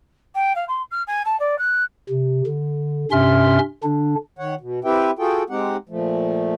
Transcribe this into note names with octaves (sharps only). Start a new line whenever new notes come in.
G5
F5
C6
F6
G#5
A5
D5
F#6
C3
D3
G2 C3 C#4 E5 C6 F6
D3 D4
D#3 C#5 F#5
B2
C4 E4 G4 B4 E5 G5
F4 F#4 G#4 A4 G5
G#3 C4 D#4 G4 F#5
A#2 F3 A3